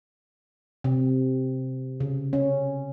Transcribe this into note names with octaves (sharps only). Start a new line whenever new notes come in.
C3
C#3
C#4